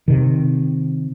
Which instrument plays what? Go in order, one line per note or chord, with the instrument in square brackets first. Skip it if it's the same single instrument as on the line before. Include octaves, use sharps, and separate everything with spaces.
[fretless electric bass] C3 D#3